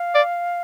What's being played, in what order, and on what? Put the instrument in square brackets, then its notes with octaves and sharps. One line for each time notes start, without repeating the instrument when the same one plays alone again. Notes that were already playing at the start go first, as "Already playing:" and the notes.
Already playing: [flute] F5
[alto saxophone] D5